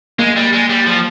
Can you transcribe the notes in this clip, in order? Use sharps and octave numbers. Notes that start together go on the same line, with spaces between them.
G#3 A#3
G3
G#3
G3
F3